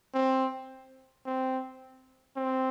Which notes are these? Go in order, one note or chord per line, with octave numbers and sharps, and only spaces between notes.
C4
C4
C4